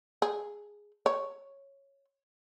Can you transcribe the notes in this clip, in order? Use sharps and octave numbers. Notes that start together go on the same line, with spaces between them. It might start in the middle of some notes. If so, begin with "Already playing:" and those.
G#4
C#5